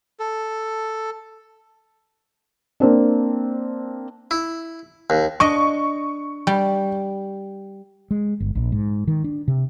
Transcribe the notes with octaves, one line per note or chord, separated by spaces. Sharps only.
A4
A#3 C4 D4
E4
D#2
D4 D#5 C#6
G3
G#3
G1
A#1
G#2
D#3
D4
C3